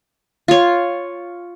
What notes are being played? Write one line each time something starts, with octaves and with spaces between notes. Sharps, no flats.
F4 C#5